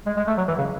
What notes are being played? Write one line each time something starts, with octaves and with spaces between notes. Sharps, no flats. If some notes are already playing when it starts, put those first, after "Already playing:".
G#3
G#3
A3
F#3
E3
C#3